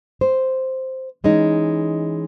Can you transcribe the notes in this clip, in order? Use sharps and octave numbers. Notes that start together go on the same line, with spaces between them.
C5
E3 G#3 C#4 D#4